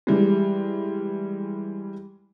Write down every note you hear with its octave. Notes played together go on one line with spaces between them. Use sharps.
E3 G3 G#3